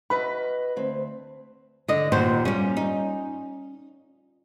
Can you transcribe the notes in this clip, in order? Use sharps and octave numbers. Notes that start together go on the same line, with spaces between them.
F#4 B4 D#5 B5
D2 C4
D3 D#5
D#2 A#2 F#4 C5
G3 A#3 C#4
D#4